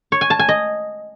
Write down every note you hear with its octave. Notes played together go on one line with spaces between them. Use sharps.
C#5
G#5
A5
G#5
D#5